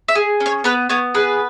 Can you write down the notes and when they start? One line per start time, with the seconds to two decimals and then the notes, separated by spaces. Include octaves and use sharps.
0.08 E5
0.15 G#4
0.40 C#4
0.46 C#5
0.64 B3 B4
0.89 B3 C#5
1.15 G#4 B4